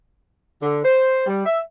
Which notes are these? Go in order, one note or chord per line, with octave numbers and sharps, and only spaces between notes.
D3
C5
G3
E5